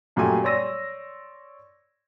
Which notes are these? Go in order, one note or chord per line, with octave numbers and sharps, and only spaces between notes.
F#2 A#2 A3 F#4 G4 G#5
C#5 D5 C6 E6 A#6 D#7